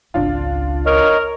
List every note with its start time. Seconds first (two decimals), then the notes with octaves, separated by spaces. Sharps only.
0.14 G#1 C#2 D4 F4
0.86 A#4 C#5 D#5